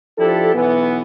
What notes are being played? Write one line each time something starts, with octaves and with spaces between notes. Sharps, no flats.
F3 D4 E4 G4 A4
B1 E3 B3